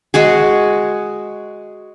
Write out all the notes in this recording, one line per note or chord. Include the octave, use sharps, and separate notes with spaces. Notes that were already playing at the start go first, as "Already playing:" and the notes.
G#3 F#4 G#4